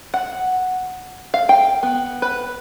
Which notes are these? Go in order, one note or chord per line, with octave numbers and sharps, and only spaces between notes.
F#5
F5
G5
B3
B4